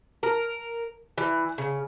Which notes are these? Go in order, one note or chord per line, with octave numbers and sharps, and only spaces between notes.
A#4
E3
C#3